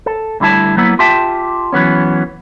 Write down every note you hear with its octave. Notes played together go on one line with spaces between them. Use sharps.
A4
D2 D3 G3 E4 A5
F#3 A#3 B3 E4
F4 G4 E5 G5 A5
E3 F#3 B3 C#4